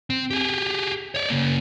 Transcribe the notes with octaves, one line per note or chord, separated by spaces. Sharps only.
C4
G4 G#4
C#5 D5
C#3 A#3